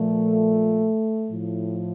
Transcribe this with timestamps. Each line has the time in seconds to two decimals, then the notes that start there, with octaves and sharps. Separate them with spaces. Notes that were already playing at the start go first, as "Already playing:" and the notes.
Already playing: A#2 F3 A3
1.30 A2 F3